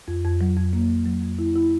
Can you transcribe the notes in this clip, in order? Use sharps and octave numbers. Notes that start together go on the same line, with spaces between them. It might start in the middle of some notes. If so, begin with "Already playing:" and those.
F2
F2
F#3
F2
A#3
F#3
F#3
F2
E4
E4